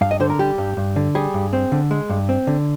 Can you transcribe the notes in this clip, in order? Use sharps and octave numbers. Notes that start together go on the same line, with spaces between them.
G2 F5
D#5
D3 C5
A#4
G3 G4
G2
G2
D3
G3 G#4
G2
C4
D3
G#3
G2
C4
D3